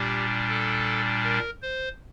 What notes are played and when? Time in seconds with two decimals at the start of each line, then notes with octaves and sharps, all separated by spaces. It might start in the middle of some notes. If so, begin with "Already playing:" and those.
Already playing: A#2 G3 D4 G4
0.49 A4
1.23 A#4
1.62 C5